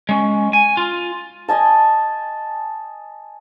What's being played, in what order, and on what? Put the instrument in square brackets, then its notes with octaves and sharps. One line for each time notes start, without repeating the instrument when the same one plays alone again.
[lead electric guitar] G#3 C#4
G#5
F4
[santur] D#5 G#5 A5